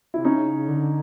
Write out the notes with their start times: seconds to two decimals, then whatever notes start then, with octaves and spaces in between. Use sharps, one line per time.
0.14 C3 E4
0.24 C#3 C#4 D#4
0.68 D3